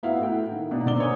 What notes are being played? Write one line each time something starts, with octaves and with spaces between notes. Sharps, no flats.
B3 E4 F#4 F5
A2 F#4 G5
D#3
B2 D4 D#4
C3 D5 G7
C#5 D5 G#5 D#6